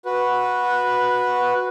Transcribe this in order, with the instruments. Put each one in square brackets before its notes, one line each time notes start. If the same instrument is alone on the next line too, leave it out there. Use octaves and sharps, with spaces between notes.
[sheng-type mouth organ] F#4 B4